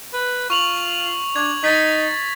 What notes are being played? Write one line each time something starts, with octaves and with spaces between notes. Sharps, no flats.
B4
F4 C#6 F7 F#7
D4 G#6
D#4 A6 B6